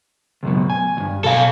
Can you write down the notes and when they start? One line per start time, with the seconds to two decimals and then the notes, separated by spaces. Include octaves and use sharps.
0.43 C#2 F#2 B2
0.70 G#5
0.97 C#2 G2
1.24 B2 A4 F5 G#5